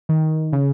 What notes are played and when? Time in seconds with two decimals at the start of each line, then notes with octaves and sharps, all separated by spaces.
0.09 D#3
0.53 C#3